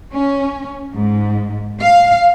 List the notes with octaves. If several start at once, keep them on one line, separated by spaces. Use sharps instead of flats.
C#4
G#2
F5